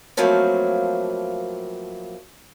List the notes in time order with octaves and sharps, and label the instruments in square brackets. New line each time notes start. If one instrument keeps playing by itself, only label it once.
[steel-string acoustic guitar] F3 F#3 A3 A#3 C4 B4